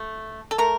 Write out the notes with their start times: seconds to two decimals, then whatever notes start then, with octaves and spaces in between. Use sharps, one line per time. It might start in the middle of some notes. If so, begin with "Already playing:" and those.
Already playing: A3
0.51 A4
0.58 A3 A#4